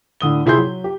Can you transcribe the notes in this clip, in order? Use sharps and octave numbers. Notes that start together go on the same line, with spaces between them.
A2 D3 D#6 G7
C3 E4 G#4 C6 G6
F#3
G4